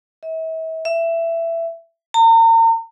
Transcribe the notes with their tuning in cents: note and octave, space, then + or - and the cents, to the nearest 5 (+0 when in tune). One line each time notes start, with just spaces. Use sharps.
E5 -40
E5 +15
A#5 -40